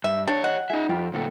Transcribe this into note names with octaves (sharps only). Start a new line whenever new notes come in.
G2 E5
D4 G4 C#5
D#5 F#5
D#4 G#4 D#5 E5
F2 F4 G4 B4
D2 A#2 G4 A4 F#5